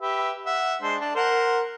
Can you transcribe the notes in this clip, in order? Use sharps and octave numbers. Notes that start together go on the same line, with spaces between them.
G4 B4 E5
E5 F#5
G#3 D4 C5
D4
A#4 C5 F#5